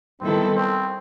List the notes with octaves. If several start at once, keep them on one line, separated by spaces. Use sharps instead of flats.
D#3 G3 B3 C4 E4 A4
C4